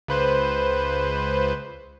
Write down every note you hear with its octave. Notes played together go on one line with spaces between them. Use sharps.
C#2 B4 C5